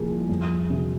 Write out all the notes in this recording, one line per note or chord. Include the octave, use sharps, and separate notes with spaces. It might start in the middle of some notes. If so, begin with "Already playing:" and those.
Already playing: C2 A#2 F3 G#4
F2
C3 F#3